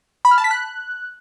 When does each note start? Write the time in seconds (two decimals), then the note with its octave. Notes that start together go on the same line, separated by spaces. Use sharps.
0.25 B5
0.31 F6
0.38 A5
0.44 B6
0.51 F#6